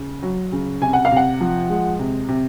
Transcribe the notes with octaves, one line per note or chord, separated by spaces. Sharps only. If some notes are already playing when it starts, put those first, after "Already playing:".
Already playing: C#3
F#3
C#3
C3 G#5
F#5
F5
C3
F#5
F3
G#3
C3
C3